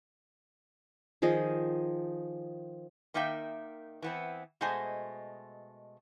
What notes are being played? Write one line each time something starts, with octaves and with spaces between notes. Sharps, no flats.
D#3 F3 G#4 D#5
D#3 A#3 D#4 E5 G5
E3 B3 C4
B2 G#3 A3 C5 D#5 G#5